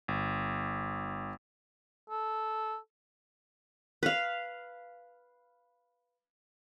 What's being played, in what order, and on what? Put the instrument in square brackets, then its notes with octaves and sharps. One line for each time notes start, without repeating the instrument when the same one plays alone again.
[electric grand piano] G1
[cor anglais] A4
[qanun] B4 F5